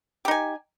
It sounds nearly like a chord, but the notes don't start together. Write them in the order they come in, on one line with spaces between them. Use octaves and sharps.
G4 D#4 G#5